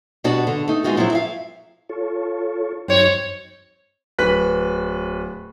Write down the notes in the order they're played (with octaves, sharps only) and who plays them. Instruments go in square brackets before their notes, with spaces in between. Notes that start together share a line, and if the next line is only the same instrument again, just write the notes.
[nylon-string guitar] B2 G3 D4 F#4
D3
A3 D#4
G#3 B3 D#4 F4 F#4
F3 F#3 C4 E4
E5 F5
[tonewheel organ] F4 A4 C#5
[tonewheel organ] G2 F#3 D#4 [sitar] C4 C#5
[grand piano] D1 B4 F#6 B6